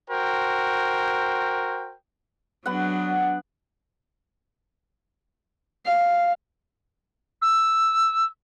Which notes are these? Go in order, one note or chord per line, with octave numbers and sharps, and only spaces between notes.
F#4 A#4 C5 G5
F#3 B3 D4 F#5
F5
E6